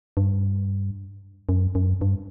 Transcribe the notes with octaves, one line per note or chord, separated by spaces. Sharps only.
G2
F#2
F#2
G2